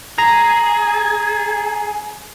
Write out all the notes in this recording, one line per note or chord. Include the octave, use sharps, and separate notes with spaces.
G#4 A#5